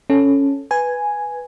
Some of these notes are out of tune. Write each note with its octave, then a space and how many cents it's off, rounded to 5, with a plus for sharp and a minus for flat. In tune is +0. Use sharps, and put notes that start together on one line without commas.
C#4 +0 A4 +0
B4 +0 G#5 +0